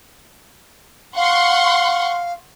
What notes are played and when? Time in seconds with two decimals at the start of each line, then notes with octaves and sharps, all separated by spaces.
1.16 F5 F#5 C6 C#6